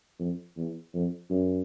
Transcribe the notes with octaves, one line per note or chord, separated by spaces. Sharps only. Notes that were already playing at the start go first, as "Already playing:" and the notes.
F2
E2
F2
F#2